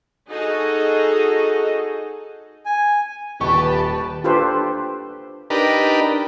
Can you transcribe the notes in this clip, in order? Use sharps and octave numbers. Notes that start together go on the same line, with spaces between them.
D#4 F#4 G#4 A4 D#5
G#5
D#1 G4 B4 A5 C#6
D4 F4 G4 A4 B4 C5
D4 D#4 G4 A#4 B4